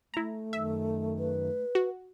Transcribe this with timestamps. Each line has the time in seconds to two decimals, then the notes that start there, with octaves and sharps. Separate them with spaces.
0.14 A3 E4 A#5
0.53 F#2 D#3 E5
1.19 B4
1.75 F#4